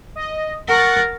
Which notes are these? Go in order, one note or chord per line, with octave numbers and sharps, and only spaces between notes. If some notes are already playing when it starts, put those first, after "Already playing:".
D#5
A#4 F#5 C#6 A6